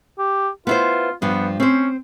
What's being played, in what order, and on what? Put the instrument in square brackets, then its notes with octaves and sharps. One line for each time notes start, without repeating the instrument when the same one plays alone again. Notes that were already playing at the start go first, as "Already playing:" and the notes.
[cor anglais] G4
[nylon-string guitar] B3 E4 C5 [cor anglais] F4
[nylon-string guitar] G2 F3 [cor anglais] B3
[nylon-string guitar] C4 C5 [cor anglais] C#4